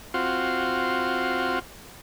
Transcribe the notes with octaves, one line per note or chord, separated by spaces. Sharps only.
C4 F4 F#4